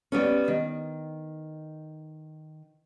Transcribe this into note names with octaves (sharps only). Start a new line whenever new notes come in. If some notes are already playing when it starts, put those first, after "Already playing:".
G3 B3 C#4
D#3